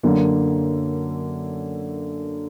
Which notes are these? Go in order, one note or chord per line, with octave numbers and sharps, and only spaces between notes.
F#2 D3 A#3